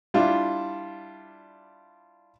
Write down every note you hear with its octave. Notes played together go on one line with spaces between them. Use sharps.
G3 D4 E4 F4